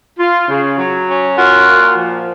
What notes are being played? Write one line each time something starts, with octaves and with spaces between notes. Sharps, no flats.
F4
C#3
F#3
C#4
F4 F#4 A#4
A#2
F3